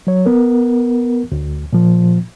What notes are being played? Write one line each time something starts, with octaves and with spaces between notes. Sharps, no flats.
F#3 C#5
B3 A#4
D2
A#2 F3